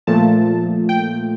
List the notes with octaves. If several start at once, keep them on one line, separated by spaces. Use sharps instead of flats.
A#2 F3 A3 A5
G5